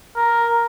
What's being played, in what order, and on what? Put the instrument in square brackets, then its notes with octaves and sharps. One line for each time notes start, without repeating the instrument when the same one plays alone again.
[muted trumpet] A#4